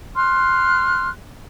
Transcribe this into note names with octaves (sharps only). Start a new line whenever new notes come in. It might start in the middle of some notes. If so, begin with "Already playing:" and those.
C6 F6 F#6